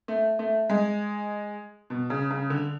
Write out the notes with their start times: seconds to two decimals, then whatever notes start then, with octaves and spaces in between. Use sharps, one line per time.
0.08 A3
0.39 A3
0.69 G#3
1.90 B2
2.10 C#3
2.30 C#3
2.50 D3